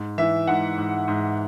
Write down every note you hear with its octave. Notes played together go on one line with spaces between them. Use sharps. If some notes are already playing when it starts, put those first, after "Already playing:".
Already playing: G#2
E3 E5
G#2 F#5
G#2
G#2